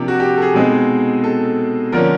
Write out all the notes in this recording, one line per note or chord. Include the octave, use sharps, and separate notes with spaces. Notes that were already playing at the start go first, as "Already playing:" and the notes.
Already playing: C3 F3 A#3 D4 G4
F#4
G4
A4
G#4
B2 G#3 C4 D#4
A4
D3 F3 A#3 C#4 A#4